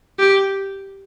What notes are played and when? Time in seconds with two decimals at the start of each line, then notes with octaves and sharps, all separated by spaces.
0.19 G4